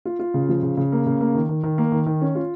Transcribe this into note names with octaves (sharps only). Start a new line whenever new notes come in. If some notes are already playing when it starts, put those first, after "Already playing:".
F4
F4
C#3
F3
C#3
C#3
A#3
C#3
A#3
D#3
D#3
D#3
A#3
D#3
D#3
C#4
F4